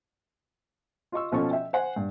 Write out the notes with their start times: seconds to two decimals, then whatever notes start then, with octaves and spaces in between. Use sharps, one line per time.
1.12 F4 D#5 C#6 E6
1.32 B2 F3 C#4 A4 C#6
1.51 E5 G5
1.73 C5 F#5 G#5
1.96 G2